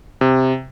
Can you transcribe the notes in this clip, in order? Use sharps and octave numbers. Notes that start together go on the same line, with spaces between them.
C3